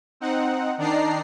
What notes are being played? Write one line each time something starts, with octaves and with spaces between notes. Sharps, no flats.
C4 D#4 F#5
D#3 D4 D#4 D5 A#5 C7